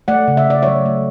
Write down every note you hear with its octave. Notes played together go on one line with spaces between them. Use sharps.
A3 D5 F#5
C#3
E5
A3 D5
F#3 C#5 E5
A3